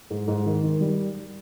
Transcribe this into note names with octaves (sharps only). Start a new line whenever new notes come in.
G#2
G#2
D#3
D#3
G3